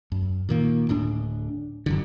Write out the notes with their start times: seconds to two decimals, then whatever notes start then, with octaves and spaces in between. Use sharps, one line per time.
0.12 F#2
0.49 A#2 D#3 A#3
0.89 D1 A2 D4
1.86 G1 F#2 D3